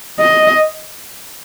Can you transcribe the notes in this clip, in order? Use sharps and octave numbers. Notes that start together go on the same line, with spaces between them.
D#5